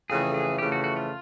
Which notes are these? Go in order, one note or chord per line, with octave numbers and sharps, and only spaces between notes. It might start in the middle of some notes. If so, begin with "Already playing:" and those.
F2 C#3 E3 A3 G#4
G#4
F2 C#3 E3 A3 G4
F#4
F#4
F4